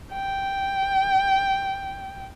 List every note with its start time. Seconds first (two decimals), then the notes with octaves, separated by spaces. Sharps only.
0.12 G5